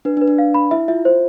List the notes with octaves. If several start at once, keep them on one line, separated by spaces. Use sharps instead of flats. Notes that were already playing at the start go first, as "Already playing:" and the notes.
D4 B4
D4
B4
D4
F5
B5
E4 E5
F4 E5
C5